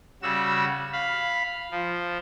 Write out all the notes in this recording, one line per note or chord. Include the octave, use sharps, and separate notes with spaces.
C#3 G3 F#4 E6
F5 B5
F3